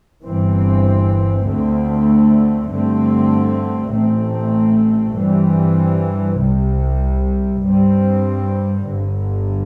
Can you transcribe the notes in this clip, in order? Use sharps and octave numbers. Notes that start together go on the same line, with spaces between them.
G1 G2 E3 C4
D2 D3 A3 C4
G2 D3 A3 C4
A1 A2 A3 C4
G2 E3 G3 C4
C2 C3 G3
G2 G3 C4
G1 G2 D3